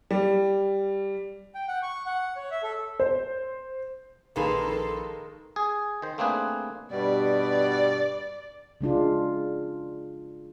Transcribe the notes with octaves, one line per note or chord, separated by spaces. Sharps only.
G3
G5
F#5
C#6
F#5
C#5
E5
A4
C5
A#1 D#3 G#3 A#3 A4 B4 C6
G#4
D#3 C5
A3 A#3 C4 D4 G#4 B4
G2 B2 G3 D5
C#3 G#3 D4 F4